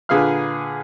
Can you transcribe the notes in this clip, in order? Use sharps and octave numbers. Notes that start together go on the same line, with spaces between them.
A#2 D3 G#4 B4 F5 F6